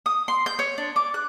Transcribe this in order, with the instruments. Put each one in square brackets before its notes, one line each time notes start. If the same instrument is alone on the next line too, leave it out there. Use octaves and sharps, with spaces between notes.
[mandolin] D#6
C6
G6
C#5
D4
D6
F#6